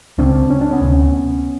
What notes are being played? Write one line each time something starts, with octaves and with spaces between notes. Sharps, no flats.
C#2 C#3 C4 D4
C#4
D4
B3 C#4
D2 C3